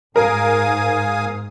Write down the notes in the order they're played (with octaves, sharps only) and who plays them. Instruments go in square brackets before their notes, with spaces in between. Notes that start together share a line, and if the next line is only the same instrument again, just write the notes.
[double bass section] G#2 [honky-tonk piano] A#4 [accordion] F5 G#5 D#6